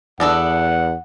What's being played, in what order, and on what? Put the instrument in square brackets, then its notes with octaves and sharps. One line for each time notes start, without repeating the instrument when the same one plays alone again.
[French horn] E2 [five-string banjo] B3 D4 A4 [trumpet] F#5